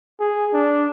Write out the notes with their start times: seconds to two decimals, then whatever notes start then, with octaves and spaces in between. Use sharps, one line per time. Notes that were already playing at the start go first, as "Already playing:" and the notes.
0.20 G#4
0.53 D4